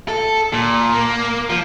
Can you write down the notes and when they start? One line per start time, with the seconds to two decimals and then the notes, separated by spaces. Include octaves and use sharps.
0.09 A4
0.53 A#2
0.94 A#3
1.50 F3